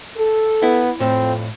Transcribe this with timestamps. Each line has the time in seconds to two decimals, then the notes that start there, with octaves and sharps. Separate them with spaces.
0.17 A4
0.63 B3 E4
1.00 F2 A2 C4